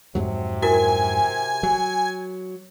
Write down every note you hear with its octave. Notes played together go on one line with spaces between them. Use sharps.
F2 G#2 C3 F#3
E4 F#4 A#4 G#5
F#3